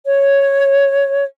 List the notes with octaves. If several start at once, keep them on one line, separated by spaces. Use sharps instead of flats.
C#5